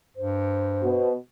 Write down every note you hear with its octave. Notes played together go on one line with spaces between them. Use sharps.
G2 C5
B2